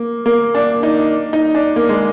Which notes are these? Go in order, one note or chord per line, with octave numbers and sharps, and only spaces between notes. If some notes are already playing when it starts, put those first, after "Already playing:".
Already playing: A#3
A#3
D4
D#4
D#4
D4
A#3
G#3